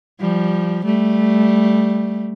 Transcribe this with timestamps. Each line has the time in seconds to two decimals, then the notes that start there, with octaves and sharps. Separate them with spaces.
0.20 F3 G3
0.85 G3 A3